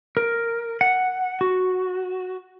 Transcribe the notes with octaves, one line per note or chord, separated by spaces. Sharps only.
A#4
F#5
F#4